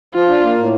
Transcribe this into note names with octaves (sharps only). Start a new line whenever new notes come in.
F3 F4
D4
A#3
A2